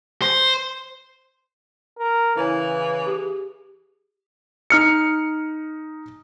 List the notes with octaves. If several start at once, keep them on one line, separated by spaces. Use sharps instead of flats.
C5
A#4
C#3 E3 E4 C#5 G#5
G4 G#4
D#4 F6 C#7